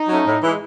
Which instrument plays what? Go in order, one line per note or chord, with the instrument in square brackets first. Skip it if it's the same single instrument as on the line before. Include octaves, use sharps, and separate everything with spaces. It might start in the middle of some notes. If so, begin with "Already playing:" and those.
Already playing: [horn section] D#4
[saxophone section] F#3 A3 C#4
A2
E3 G#3